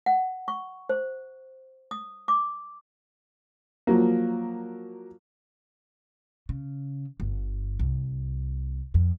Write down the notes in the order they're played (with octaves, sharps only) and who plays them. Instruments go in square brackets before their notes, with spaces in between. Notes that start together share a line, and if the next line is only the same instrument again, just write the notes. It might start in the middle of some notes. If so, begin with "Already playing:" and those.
[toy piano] F#5
C#6
C5
D#6
D6
[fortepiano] F3 F#3 A#3
[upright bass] C#3
G1
C2
F2